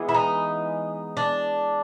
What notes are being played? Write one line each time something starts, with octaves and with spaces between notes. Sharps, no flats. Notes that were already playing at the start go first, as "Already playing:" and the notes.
Already playing: E3 G#3 B3
E4
D#4
D4